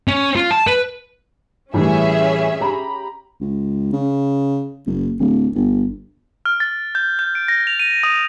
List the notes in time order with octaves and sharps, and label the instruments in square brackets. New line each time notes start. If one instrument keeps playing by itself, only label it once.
[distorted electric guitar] C#4
F4
A5
B4
[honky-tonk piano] A2 E3 G3 [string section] C#4 G#4 E5
[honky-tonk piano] G4 A#5 B5
[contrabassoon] C#2
C#3
F#1
D1
G1
[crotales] F6
A6
G6
G6
D7
A#6
F7
D#7
D#6